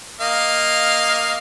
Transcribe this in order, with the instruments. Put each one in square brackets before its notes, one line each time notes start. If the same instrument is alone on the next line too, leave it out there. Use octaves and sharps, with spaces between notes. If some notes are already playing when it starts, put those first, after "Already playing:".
[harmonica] A#3 D#5 F5